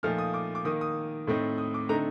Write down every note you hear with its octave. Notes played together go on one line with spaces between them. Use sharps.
A#2 F3 A3 D#4 F6
D#6
D6
D6
D#3 A#3 D#4 D#6
D#6
A2 A3 C4 D#4
D#6
D6
D3 A3 C4 D#4 A#5